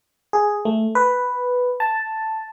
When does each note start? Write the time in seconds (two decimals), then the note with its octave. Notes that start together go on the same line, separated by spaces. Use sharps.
0.33 G#4
0.65 A3
0.95 B4
1.80 A5